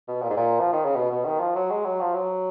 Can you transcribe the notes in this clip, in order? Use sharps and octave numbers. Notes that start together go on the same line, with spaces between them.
B2
A#2
G#2
A#2
F3
D#3
C#3
B2
B2
D#3
F3
F#3
G#3
F#3
F3
F#3